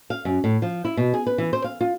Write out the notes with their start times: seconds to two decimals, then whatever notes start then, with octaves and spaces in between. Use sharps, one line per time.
0.10 F5
0.25 F#2
0.44 A2
0.62 F3
0.85 E4
0.97 B2
1.14 G#4
1.27 B4
1.38 E3
1.53 C5
1.64 F5
1.81 F4